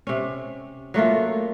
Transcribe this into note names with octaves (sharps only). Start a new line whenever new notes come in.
C3 C#4
F#3 A3 A#3 F4